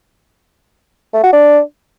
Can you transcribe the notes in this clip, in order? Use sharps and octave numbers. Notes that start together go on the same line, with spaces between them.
A3
F#4
D4